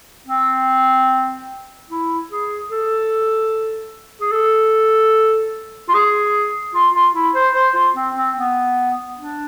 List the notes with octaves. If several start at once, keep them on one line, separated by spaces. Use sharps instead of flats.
C4
E4
G#4
A4
G#4
A4
F4
G#4
F4
F4
E4
C5
C5
F4
C4
C4
B3
D4